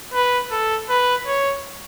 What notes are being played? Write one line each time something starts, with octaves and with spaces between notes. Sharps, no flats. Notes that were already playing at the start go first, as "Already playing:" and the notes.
B4
A4
B4
C#5